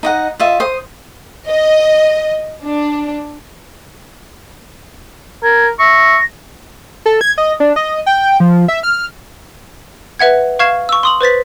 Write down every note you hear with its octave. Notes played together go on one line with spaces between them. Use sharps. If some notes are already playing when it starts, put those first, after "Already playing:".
D#4 D#5 F#5
F4 D#5 E5
C5 D#6
D#5
D4
A#4 G#6
E5 C#6 A#6
A4
G#6
D#5
D4
D#5
G5
F3
E5
F6
B4 E5 F#5 G#6
F5 C#6 F6 G#6 C7 E7
C#6 E6
C6 D#6 F#7
B4 C5 A6 B6